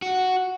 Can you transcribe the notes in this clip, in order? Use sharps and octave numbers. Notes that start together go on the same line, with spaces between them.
F#4